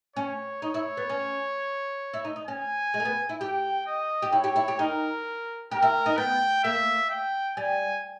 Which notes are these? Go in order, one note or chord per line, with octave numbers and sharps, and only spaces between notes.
C#4 C#5
D#4 C#5
E4
B3
C#4
E4
D#4
D#4
C#4 G#5
G#3
A#3
B3
E4
G4 G5
D#5
G4
E4 C#5
G4
E4
G4
D#4 A#4
G4 A#4
E4
D#4
B3 G5
A#3 E5
G5
G3 G#5